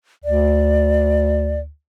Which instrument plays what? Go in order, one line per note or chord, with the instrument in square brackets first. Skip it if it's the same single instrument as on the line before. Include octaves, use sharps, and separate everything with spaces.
[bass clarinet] D2 [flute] D5